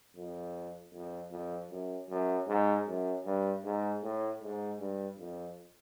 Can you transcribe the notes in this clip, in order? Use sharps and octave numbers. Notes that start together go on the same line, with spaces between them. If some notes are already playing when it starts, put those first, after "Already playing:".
F2
F2
F2
F#2
F#2
G#2
F#2
G2
G#2
A2
G#2
G2
F2